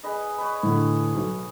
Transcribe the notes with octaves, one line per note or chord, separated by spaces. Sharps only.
G#4 B4 D#5
B4 C#5
A2 D3
B1